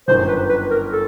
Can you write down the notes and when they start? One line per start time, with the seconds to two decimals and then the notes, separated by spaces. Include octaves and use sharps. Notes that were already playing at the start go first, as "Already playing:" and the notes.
0.08 G1 F#2 D#3 C5
0.28 B4
0.49 B4
0.71 A#4
0.92 A4